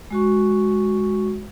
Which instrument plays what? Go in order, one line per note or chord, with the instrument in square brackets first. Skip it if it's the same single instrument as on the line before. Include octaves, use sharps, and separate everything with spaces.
[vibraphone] G#3 F#4 C#6